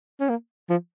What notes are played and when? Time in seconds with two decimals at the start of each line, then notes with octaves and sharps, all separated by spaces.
0.20 C#4
0.29 A#3
0.70 F3